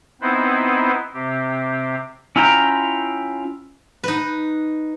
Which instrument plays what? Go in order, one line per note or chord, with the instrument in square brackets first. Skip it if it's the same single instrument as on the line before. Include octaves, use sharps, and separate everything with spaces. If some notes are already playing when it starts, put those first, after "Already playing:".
[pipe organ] B3 C4 D#4 E4 B4 C5
C3 C4 G4
[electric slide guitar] C#4 E4 F4 G5 A#5
[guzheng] D#4 B4